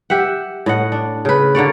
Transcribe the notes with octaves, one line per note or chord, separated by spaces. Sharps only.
G4 E5 F#5
A2 D#5 F#5
D4
C#3 B4
D3 A#3 C#5 D5